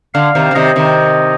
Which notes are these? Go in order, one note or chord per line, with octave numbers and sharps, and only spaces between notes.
D3 F5
C3 D#3
D3
C3 D#3 D#5
C3 D#3